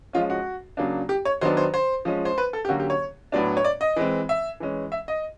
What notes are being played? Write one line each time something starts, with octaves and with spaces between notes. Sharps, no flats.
F3 G#3 C#4 F4
F#4
C#3 F#3 A#3 D4
G4
C#5
D#3 F#3 B3 D4 C5
C5
C5
F3 G#3 C#4
C5
B4
A4
G4
D3 F#3 A#3 C#4 F#4
G4
C#5
A2 F#3 B3 D4 D5
C#5
D5
D#5
E3 G#3 C4
E5
E3 G#3 C#4
E5
D#5